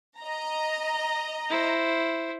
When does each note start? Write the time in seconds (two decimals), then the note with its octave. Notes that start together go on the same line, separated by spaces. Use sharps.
0.19 D#5 A#5
1.50 E4 C5